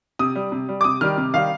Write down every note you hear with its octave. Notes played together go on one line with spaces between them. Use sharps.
C3 D#6
G3
C3
G3
D6
C3 D#6
D#3 G3 F6
C3
D#3 G3 F5